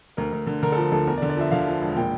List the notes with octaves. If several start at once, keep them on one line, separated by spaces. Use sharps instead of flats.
D2 A#4
D2
D3
D3 A#4
A4
F3
D2 A4
E2 A#4
D5
D3
D5
F3 E5
D3 F5
F3
E1
A#2 G5